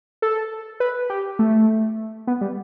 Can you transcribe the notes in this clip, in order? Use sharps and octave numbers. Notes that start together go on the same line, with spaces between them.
A4
B4
G4
A3
B3
G3